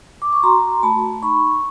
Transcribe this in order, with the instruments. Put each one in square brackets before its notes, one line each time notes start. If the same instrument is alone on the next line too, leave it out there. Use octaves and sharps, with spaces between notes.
[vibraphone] D6
C#6
F#4 A#5 C6
A3 A5 B5
D#4 B5 C#6